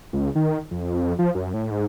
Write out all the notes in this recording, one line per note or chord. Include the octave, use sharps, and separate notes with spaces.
C#2
D#3
F2
F3
F#2
A2
G#2